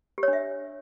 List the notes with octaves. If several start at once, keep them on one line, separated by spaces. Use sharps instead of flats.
G4
C#5
D4
E5